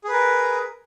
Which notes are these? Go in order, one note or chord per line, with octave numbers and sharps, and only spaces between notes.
G#4 A#4 B4